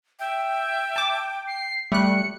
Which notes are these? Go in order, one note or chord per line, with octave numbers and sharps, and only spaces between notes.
E5 G5
A5 D6
C7
G3 A3 F#6 C#7